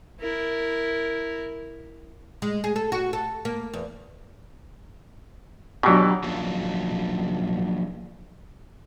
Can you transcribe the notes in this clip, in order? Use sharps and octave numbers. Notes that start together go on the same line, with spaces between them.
E4 A#4
G#3
G#4
A4
F#4
A4
A#3
E2
B2 E3 F#3 D4 G4
F3 F#3 A#3 C#4 D4 F4